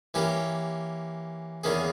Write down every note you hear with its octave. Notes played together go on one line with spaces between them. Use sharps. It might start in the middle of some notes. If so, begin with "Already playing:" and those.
E3 A#3 C#4 G4
E2 D#3 A#3 C#4 G#4